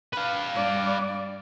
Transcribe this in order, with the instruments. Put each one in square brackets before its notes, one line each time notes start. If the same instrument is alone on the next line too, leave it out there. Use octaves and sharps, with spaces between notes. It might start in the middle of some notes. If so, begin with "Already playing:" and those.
[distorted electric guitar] B4 F5
[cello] G2 D5